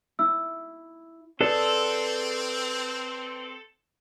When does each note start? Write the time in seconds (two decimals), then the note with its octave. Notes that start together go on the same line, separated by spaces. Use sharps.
0.19 E4 E6
1.41 C4 G#4 A4 B4 D5